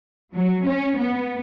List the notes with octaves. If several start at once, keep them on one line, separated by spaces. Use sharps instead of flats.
F#3
C#4
B3